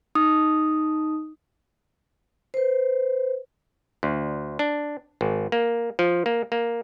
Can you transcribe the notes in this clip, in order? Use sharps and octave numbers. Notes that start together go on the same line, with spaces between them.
D#4 D#6
B4 C5
D2
D4
G#1
A#3
F3
A#3
A#3